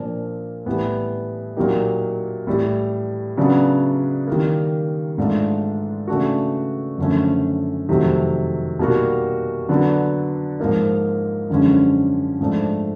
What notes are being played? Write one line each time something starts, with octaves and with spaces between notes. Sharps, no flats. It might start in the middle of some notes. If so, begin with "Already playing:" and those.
Already playing: A#2 F3 A#3 D4
A2 E3 G3 B3
A#2 F#3 A#3 D#4 G4
A2 E3 G3
C#3 F#3 B3 D4
D#3 G3 A#3
G#2 E3 A3 D4 F4
C#3 E3 A3 D4 F#4
F#2 D3 F3 A3 C#4
F2 C3 D#3 F#3 A3
B2 G3 A#3 D#4 F#4
D3 F#3 B3 D4
G#2 F3 A#3 D#4
F#2 D3 F3 G#3 C#4
G#2 F3 A3 D4